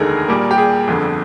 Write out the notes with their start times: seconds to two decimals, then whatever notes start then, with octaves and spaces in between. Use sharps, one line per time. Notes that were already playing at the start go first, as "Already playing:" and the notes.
Already playing: F1 D#2 D3 G#3 D#4 G#4 A#4
0.28 A#2 G3 A#3
0.51 G4
0.58 G#4
0.88 G1 F2 D3